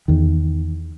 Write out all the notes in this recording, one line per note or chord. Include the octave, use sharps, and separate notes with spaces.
E2 D#3